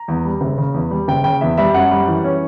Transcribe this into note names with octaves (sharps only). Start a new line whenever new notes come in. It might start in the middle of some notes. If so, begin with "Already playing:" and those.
Already playing: A#5
E2
G3
F#1
C#3
E2
G3
F#1 G5
C#3 G5
E2 E5
G3 E5
F#2 F#5
G3
E3
C#4